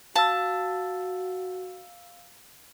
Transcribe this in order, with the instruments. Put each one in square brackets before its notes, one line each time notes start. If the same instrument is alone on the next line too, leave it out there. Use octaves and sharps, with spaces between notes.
[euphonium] F#4 [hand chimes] F5 E6 [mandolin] A5